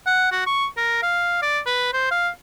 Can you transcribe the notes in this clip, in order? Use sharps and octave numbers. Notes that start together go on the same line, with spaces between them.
F#5
F#4
C#6
A#4
F5
D5
B4
C5
F5